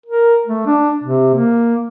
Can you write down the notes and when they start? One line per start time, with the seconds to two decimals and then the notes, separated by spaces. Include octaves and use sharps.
0.06 A#4
0.46 A3
0.67 D4
1.04 C3
1.34 A#3